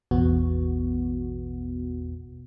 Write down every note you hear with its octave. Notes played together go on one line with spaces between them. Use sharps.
A1 E2 B2 B3 F#4